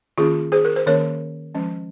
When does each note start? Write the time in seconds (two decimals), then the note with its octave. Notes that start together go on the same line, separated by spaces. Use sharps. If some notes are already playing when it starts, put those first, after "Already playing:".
0.18 D#3 A#3 C#4 F4 G#4
0.52 G#4 C5
0.65 A#4
0.76 C5
0.87 D#3 A#3 C#4 A#4 C#5
1.54 F3 G#3 C#4